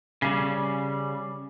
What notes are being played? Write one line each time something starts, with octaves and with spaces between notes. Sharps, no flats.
C#3 G3